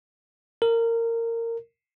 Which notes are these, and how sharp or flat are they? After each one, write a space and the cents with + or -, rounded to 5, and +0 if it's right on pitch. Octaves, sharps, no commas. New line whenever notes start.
A#4 -20